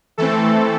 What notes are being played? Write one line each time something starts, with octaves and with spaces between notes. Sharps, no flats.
E3 A3 C4 A4